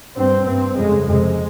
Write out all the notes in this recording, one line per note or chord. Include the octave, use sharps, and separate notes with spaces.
G2 C4
G2 C4
F2 C#3 G#3
F2 C3 G#3